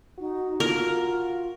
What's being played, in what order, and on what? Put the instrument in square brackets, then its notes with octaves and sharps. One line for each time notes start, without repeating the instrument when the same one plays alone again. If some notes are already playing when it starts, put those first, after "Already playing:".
[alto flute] D#4 [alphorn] F#4
[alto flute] F4 [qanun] A#4